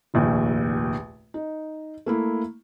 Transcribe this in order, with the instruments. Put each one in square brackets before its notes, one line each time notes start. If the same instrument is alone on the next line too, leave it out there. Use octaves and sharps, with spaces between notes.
[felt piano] F1 A#1 D#2 A#2
D#4
A3 A#3 E4